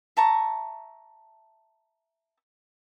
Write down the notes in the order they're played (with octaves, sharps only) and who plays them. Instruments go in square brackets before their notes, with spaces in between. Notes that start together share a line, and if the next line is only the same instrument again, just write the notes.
[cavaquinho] E5 A5 A#5 C#6